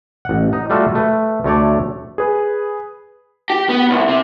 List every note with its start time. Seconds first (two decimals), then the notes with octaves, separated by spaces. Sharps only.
0.25 A1 F#5
0.53 D#4
0.70 G3 A3 F4 F#4 A4
0.95 A3 B4
1.44 D2 A3 C#5 D5
2.18 G#4 B4
3.50 G4
3.69 B3
3.90 C2
4.08 C3